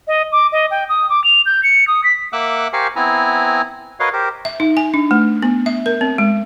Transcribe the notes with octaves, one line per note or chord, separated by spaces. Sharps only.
D#5
D6
D#5
G5
D#6
D6
F7
G6
C#7
D#6
B6
A#3 E5 F#5 D6 E6 F#6
G4 A#4 C5 F5 G#5 C#6
B3 C4 E4 G#5 A#5
F#4 A#4 B4 C#5 D#5 F5
G4 A#4 C5
E5
D#4
G#5
D4
A3
B3
E5
A#4
C4
G#3